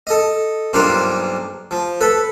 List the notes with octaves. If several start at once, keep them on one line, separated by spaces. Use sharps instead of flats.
A4 D#5
B1 G2 A#3 D4 F4 C5
F3
A4 B4